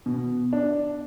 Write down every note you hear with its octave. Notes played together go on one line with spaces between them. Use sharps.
B2
D4